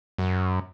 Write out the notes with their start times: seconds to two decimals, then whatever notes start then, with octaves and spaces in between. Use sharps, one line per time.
0.19 F#2